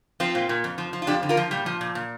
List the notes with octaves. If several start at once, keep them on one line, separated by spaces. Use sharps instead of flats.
F3 C4 F4
A#2
A#2
F2
F3
F3
F4
F2 D4 G4
D3
F4 A#4
F3
A#2 G3
F3
A#2
A#2